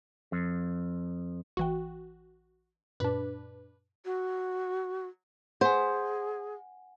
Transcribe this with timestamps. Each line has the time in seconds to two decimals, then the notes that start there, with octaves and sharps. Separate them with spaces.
0.32 F2
1.57 A1 E3 F#4 G5
3.00 F#2 A#2 D4 B4
4.05 F#4
5.61 G#4 C5 F#5 G#5